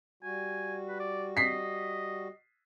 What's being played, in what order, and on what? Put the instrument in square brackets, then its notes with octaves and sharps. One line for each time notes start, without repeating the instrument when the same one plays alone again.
[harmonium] G3 F#4 [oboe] G#5
[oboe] B4
D5
[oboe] D#5 [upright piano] B6 C7